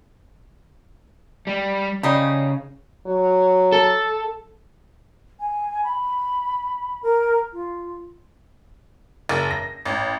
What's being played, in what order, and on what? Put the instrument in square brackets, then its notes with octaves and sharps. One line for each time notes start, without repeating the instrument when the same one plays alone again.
[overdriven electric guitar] G3
[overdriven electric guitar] C#3 [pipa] G3 D#4
[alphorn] F#3
[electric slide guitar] A4
[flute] G#5
B5
A#4
F4
[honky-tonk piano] F#1
A#6
A1